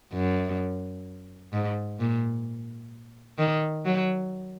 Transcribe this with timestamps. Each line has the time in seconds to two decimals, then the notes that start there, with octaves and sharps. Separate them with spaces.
0.13 F#2
1.53 G#2
2.00 A#2
3.38 D#3
3.85 F#3